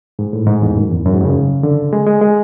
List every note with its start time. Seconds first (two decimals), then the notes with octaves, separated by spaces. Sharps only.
0.19 G#2
0.33 A2
0.47 G#2
0.62 E2
0.77 F#2
0.91 E2
1.06 F#2
1.14 G#2
1.25 C#3
1.63 D3
1.93 G#3
2.06 G#3
2.21 G#3